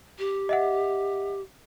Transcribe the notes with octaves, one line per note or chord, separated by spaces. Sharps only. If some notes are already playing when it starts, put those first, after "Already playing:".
G4
D#5 E5 F#5